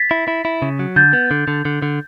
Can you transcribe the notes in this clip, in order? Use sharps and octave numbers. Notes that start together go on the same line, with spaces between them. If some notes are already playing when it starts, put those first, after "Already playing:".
Already playing: A6 B6
E4
E4
E4
C#3
F#3
D3 G6 A6
B3
D3
D3
D3
D3